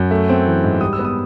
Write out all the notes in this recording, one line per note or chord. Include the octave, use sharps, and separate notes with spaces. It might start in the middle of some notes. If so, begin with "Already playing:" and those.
Already playing: F#2
A3
C4
E3
G#2
G3 D#6
E6
B3
D#6